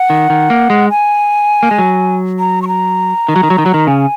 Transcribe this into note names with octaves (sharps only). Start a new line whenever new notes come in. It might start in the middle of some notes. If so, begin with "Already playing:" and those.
Already playing: F#5
D#3
D#3
A#3
G#3
G#5
A#3
G#3
F#3
A#5
C#6
A#5
D#3
F#3
D#3
F#3
D#3
F#3
D#3
C#3 G#5